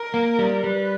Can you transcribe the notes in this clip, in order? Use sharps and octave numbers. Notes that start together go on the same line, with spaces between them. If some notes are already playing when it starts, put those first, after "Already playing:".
Already playing: A#4
A#3
G3
G3 B4